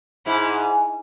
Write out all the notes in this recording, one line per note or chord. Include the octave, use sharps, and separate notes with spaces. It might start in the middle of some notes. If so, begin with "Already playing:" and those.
G#2 E4